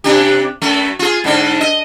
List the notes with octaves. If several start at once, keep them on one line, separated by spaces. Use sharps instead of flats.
C3 D4 G4
F#2 A3
F4 G#4
G#2 D3 D4
D#5